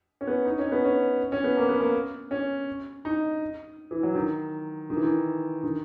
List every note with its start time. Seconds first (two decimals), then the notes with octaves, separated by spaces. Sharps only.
0.21 C#4
0.27 B3
0.46 D#4
0.59 C#4
0.72 B3
0.84 C#4
1.32 C#4
1.44 B3
1.57 A#3
1.69 B3
1.81 A#3
2.31 C#4
3.05 D#4
3.91 E3
4.03 F#3
4.15 D#3
4.90 D#3
4.96 E3
5.03 D#3
5.63 D#3